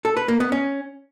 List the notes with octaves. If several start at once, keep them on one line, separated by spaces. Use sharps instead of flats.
A4
B4
A#3
B3
C#4